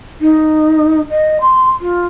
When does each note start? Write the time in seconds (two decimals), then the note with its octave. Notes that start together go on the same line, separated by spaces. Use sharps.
0.21 D#4
1.10 D#5
1.41 C6
1.81 F4